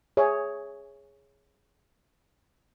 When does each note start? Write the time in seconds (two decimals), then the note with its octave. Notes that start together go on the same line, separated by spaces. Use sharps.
0.17 G#4 C#5 E5